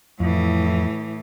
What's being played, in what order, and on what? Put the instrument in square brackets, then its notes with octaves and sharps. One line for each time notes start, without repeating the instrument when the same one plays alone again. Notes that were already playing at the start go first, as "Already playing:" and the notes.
[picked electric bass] F2 [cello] A2 E3